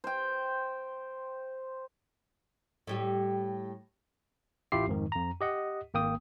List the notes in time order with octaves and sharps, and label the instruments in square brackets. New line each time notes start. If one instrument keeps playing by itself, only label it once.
[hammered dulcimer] C5 G5
[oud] A2 G3 G4
[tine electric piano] A1 E4 F4 G4 E5 C7
F2 G#2 D#3
F2 A#5
G4 D#5 F#5
G#1 A#3 G5 D#6